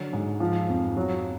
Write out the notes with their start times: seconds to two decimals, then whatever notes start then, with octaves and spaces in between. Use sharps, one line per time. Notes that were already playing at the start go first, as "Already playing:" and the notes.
Already playing: D3 F#3
0.13 G#2
0.40 F3
0.69 F2
0.97 F#3